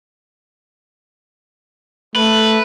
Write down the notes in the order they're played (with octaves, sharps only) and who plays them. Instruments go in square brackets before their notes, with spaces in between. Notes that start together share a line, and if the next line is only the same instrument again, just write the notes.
[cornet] A3 [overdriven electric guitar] B4